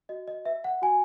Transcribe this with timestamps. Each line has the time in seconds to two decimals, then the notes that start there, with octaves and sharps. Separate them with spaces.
0.09 F#4 D#5
0.28 D#5
0.45 B4 E5
0.64 F#5
0.82 F#4 G#5